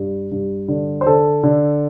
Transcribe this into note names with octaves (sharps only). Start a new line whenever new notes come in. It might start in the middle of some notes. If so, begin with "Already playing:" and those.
Already playing: G2
G2
D3
C5
D3 A4
D3